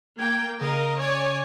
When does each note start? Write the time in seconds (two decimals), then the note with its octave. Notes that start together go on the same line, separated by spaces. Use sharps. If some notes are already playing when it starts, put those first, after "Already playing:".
0.18 A#3 G5 G#6
0.61 C#3 A#4 D#5 F5
1.00 C#5 D5 G#5